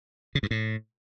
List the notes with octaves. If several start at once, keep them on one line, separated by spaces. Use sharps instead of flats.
C#3
G2
A2